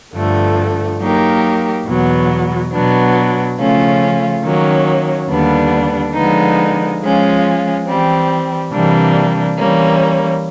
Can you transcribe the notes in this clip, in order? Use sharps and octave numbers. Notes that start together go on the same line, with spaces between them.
G2 D3 F3 A3
F#3 A#3 D#4 G4 A#4
E2 B2 F#3 B3
B2 F#3 B3 D4
C#3 F3 A3 C#4 F4
D#3 F#3 A#3 C#4
D#2 D3 G3 B3 D4
D3 F3 G#3 B3 D#4
F3 G#3 C#4 F4
E3 G3 C4
C3 E3 G3 A#3 D4
E3 G3 A#3 C#4